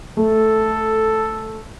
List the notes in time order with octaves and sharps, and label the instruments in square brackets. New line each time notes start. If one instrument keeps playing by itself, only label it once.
[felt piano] A3 [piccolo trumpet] A4